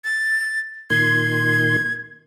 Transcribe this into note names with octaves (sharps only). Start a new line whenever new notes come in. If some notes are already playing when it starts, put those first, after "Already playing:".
A6
A#2 D#3 C6 G#6